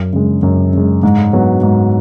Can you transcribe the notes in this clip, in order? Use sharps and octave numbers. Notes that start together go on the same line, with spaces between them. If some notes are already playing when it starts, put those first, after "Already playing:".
Already playing: F#2
C#3 G#3
F#2
C#3 G#3
G#2
F#3 B3 F#4
G#2